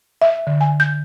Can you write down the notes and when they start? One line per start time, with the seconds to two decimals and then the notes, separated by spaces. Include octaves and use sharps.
0.22 E5
0.47 D3
0.61 G#5
0.80 G6